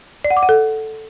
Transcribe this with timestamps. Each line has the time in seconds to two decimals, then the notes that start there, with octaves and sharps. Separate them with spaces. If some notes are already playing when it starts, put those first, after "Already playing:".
0.24 D5
0.31 F#5
0.37 D6
0.43 F#5
0.49 A4